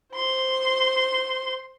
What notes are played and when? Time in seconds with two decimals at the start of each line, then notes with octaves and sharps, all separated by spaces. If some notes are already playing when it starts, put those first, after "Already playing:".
0.14 C5 C6